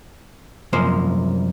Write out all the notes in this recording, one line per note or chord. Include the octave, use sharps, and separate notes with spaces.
C2 F#2 F3 A#3 C5